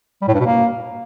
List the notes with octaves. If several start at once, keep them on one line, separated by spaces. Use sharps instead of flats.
G3
A2
G2
B2
A#3